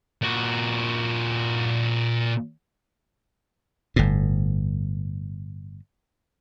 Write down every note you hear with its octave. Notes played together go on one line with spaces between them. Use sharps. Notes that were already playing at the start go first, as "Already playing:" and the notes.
A#2 F#4
G1 A2